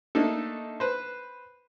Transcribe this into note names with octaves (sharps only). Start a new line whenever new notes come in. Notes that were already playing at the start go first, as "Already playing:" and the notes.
A3 A#3 D4 D#4 A4
B4 C5